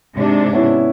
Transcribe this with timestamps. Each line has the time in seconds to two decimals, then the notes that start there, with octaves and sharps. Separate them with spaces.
0.15 G#2 C3 D4
0.53 B3 C#4 E4